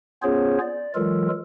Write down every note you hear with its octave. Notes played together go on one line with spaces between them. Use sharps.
B3 C#4 F4 G#4 C5 C#5
D5
E3 F#3 G#3 F4 A4 A#4